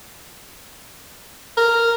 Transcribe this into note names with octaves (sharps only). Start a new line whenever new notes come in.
A#4